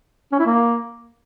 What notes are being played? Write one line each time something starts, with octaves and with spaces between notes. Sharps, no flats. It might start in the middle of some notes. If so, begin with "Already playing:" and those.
C#4
E4
A#3